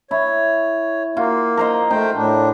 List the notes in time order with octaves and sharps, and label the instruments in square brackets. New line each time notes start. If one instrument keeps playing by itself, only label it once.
[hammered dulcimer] E4 [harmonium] C#5
[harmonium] A#3 [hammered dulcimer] F4 F#4
[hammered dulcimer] A#4 C5 D#5
[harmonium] A3 C5 G5 [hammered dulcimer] D#4
[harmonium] A2 D4